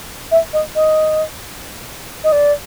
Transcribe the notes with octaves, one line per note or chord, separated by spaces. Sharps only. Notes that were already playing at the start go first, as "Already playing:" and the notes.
E5
D#5
D#5
D#5
D5